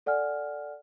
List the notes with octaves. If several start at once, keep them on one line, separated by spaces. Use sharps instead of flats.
A4 D5 F#5 G#5 F6